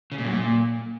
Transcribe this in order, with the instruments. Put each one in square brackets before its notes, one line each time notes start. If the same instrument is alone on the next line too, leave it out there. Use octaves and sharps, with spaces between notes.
[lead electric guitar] C#3
A#2
F#2
A#2